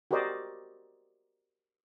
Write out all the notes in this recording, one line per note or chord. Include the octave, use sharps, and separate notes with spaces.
F#4 G4 A#4 C5 D5 D#5